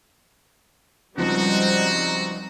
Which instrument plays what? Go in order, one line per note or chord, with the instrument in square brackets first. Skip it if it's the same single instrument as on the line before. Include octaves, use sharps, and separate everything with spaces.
[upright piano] C#2 F3 [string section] G3 C4 D#4 [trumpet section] F#4